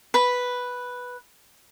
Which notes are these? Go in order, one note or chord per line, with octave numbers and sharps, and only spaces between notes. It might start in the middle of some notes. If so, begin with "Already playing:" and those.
B4 B5